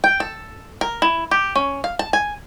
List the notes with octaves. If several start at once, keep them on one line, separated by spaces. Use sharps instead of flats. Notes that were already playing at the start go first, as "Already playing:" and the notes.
G5
A4
A#4
E4
G4
C#4
F5
A5
G#5